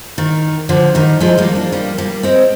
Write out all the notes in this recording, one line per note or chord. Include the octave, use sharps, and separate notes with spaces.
D#3
D3 F3
D#3 G3
F3 G#3
G3 A#3
A#3 D4
G3 A#3
G3 A#3
G#3 C4